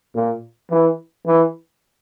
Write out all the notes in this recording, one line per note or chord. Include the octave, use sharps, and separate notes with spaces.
A#2
E3
E3